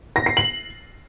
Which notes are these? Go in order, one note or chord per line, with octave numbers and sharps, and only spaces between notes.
A#6
C7
F#7